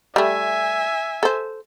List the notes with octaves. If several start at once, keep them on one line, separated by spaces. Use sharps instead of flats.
G3 A3 E5 G#5
A4 C5